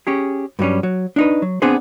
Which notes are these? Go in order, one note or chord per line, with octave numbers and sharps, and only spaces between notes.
C#4 G4 G#4
G2 F#3 G3 C#4
F#3
D4 D#4 B4
F#3
B3 C4 D4 G#4 B4 C5